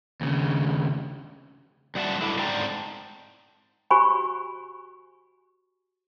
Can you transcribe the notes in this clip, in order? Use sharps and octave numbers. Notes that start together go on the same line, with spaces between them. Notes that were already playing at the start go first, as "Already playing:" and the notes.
D#2 C#3
F#2 G3 F#4 D5 E5 A5
D4 E4 A4
G#2 C4 D5 G5 A5 A#5
F#4 G4 C5 G#5 B5 C#6